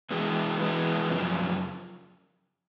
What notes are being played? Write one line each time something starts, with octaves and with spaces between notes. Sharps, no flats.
E3 G#3 B3
E3 G#3 B3
F#2 C#3 F3